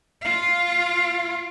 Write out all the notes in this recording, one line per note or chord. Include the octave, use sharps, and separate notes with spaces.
F4 F5